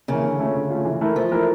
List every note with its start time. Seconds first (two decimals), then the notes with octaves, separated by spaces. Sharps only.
0.08 C#3 E3 A#3
0.24 D3
0.40 A3 C#4 F4
0.55 D3
0.70 A3 C#4 F4
0.85 E3
1.01 A3 E4 A#4
1.16 E3 F3
1.32 A3 E4 A#4